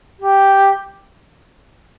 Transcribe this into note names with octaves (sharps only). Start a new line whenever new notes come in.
G4